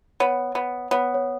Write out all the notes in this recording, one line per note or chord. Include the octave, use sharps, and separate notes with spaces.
B3 C#5
B3
B3 C#5
C#5